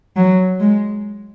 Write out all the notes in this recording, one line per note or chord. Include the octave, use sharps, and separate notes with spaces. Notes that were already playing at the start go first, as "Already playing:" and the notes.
F#3
G#3